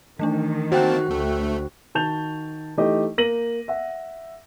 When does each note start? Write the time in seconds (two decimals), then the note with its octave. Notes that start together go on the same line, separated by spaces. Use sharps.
0.19 D#3 E3 A3 D4
0.72 A#3 C4 F#4 C5 G5 A5 F#6
1.11 D2 A3
1.95 D#3 F#4 A5 G6 F7
2.77 E3 A3 D#4 G4 D#5
3.18 A#3 A#6 D#7 F#7
3.68 E5 F#5